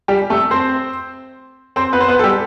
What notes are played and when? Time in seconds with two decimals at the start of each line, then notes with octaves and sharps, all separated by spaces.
0.08 G3 G4
0.30 A3 A4
0.51 C4 C5
1.76 C4 C5
1.93 B3 B4
2.01 C5
2.08 B3 B4
2.19 A4
2.24 G3 G4